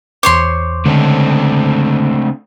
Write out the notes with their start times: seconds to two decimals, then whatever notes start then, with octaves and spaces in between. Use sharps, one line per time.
0.23 E2 C5 C#5 C6 D6
0.86 C#2 D3 A3 C4 D4